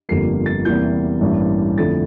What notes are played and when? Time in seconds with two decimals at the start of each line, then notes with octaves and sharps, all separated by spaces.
0.09 G1 F2 D3 G3 A#3 C7
0.46 A6
0.65 E2 C3 G3 A#3 E4 G6
1.21 A1 G2 E3 A#3
1.78 F2 D3 A3 E4 A6